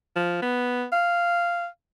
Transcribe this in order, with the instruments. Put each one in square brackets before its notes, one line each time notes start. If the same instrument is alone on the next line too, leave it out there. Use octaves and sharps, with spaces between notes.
[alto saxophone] F3
B3
F5